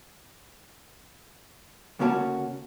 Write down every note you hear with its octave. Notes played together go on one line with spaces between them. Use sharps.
D2 C#3 A#3 C#4 F#4 A5